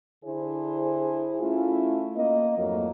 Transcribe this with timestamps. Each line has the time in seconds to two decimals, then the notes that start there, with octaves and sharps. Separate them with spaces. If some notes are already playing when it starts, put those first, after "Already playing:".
0.25 D3 D4 E4 G#4 C5
1.40 A3 C#4 E4 F4
2.16 A#3 D#5
2.57 F2 G#2 F#3 A3 A#3